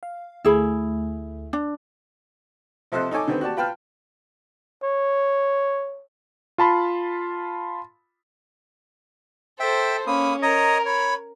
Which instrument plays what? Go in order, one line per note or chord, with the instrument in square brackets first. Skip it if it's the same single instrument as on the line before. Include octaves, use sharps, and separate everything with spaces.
[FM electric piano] F5
[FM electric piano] D2 A3 [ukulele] E4 G#4 B5
[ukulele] D4
[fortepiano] C3 F3 A4 C5 D#5 F#6
D#4 A4 C#5 G#5 D6
D3 D#3 G3 B3 C4
F#4 G4 D5 A5
F4 B4 G5 A5 F6
[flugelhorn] C#5
[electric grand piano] F4 A5 B5 C6
[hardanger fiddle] A4 C5 [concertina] E5 G5
[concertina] A#3 D#6 [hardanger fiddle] C#4 [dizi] B5
[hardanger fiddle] A#4 [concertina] C#5 D#5 D#6 [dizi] A#5
[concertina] C#5 [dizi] B5